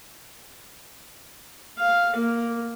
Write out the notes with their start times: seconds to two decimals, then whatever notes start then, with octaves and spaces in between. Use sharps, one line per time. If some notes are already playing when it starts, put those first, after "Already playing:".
1.79 F5
2.16 A#3